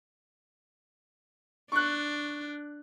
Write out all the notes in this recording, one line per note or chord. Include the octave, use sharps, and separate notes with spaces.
D4 C#6 F#6